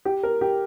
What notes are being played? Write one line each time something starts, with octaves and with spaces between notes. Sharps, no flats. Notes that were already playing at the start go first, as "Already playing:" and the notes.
G4
A#4
G4